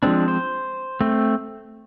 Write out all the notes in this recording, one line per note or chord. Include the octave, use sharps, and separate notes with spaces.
F3 G#3 C4 D4
C5
A3 C4